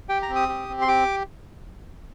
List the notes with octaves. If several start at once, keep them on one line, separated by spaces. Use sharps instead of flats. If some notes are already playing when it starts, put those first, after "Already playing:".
G4 G5
A#5
C4
D#6
G4
C4
C6
G4 D6